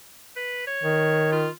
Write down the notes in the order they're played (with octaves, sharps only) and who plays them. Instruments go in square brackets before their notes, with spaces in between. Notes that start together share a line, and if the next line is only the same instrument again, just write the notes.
[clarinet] B4
C#5
[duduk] D#3
[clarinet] F4